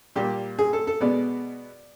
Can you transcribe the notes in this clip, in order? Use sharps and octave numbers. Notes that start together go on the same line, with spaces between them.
A#2 G3 A#3 G4
G#4
A4
A4
B2 G#3 B3 D5